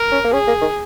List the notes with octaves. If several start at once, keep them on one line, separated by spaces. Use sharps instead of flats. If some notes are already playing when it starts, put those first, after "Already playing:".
Already playing: A#4
C#4
A#3
C#4 G#4
A#3
D#3